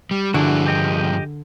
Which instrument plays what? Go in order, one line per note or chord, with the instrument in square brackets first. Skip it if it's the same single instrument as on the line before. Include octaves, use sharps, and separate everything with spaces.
[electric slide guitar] G3
[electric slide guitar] G2 F3 G#4 [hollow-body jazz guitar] D3 [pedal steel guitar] D4 E4 F#4
[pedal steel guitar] G4 D#5 G5